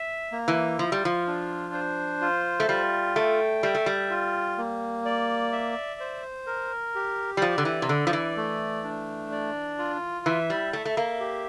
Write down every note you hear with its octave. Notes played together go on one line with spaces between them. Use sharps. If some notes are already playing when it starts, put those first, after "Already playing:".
Already playing: E5
A#3
E3
F3 F4
G3
F3
D4
C5
F4
A3
G3 F4
A3 G5
G3 E5
A3
G3
F4
A#3
D5
E5
C5
A#4
G4
G3
F3 D5
D3
E3
C3
D3 D5
F3
E3
A3
D4
D5
F4
E3 E5
G3
A3 E5
A3
A#3
G4